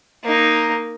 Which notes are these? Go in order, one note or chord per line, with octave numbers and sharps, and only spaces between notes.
A#3 D#4